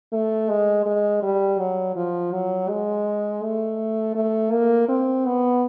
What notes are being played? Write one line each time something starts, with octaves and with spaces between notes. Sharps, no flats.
A3
G#3
G#3
G3
F#3
F3
F#3
G#3
A3
A3
A#3
C4
B3